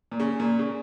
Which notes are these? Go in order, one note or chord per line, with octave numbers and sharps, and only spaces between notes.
A#2
C#3
A#2
C#3